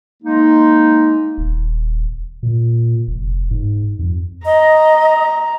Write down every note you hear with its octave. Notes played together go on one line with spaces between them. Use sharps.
G#3 A#3 D#4
D#1
A#2
F1
G#2
F2
D#5 A#5